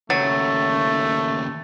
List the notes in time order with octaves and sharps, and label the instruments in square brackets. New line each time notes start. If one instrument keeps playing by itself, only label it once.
[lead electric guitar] D#2 C#3 [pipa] F#3 [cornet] A3 [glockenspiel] A6